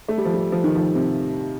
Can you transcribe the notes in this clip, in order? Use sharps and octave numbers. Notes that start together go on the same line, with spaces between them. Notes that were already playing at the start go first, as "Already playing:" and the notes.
A3
G3
F3
G3
F3
D#3
F3
C3